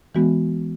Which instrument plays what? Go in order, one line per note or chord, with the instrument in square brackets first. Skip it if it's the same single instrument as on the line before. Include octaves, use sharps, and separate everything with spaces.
[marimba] E3 G#3 B3 F#4